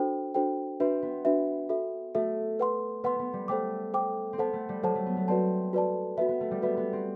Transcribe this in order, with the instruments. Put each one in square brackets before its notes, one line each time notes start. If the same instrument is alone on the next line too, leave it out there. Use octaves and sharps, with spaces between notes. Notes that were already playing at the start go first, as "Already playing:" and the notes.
Already playing: [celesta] D4 F#4 A4 C5 G5
D4 F#4 A4 C5 G5
[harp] C4 [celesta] D4 F#4 B4 E5
[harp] B3
[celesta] D4 F#4 B4 E5
F#4 A4 E5
[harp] A3 [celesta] F#4 A4 E5
[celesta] B4 F#5 C6
[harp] B3 [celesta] B4 F#5 C6
[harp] B3
G3
[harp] A3 [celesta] A4 C5 G5 D6
[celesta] A4 C5 G5 D6
[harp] C4
[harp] B3 [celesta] A4 C5 F#5 A5
[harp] A3
G3
[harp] F#3 [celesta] A4 C5 F#5 A5
[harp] A3
B3
A3
[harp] C4 [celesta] F#4 B4 D5 A5
[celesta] F#4 B4 D5 A5
[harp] B3 [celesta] F#4 B4 E5
[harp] B3
A3
G3
[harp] B3 [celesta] F#4 B4 E5
[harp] B3
C4